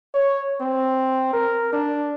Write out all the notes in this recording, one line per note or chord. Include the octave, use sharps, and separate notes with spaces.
C#5
C4
A#4
D4